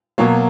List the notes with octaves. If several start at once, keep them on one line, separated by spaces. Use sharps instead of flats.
B2 F#3 A#3 C#5